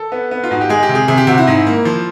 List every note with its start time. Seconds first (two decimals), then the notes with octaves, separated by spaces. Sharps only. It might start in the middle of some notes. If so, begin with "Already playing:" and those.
Already playing: A4
0.12 B3
0.31 B3
0.44 F4
0.51 G#2 F#4
0.61 G4
0.69 G#3 G#4
0.83 G4
0.89 C3
0.95 G#4
1.08 C3 G#4
1.18 G4
1.27 C3 F#4
1.38 E4
1.47 G#2
1.67 A#3
1.85 F3